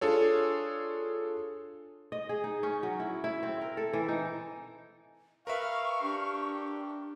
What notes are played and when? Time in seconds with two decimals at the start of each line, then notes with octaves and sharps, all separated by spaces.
0.01 D4 F4 G#4 A4 C#5
2.12 D#5
2.29 G#4
2.44 D#4
2.63 C#4
2.83 F#3
3.00 E4
3.24 E4
3.43 C4
3.61 A#4
3.77 A4
3.93 E3
4.08 D#4
5.47 A#4 B4 E5 F5 C#6
6.02 D4 G4